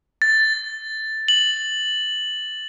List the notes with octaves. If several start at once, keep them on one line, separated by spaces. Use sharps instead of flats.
A6
F#7